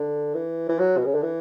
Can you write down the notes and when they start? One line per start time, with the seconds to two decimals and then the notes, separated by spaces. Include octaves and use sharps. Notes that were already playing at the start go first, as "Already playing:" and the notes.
Already playing: D3
0.35 E3
0.69 E3
0.79 F#3
0.97 B2
1.05 C#3
1.14 D3
1.22 E3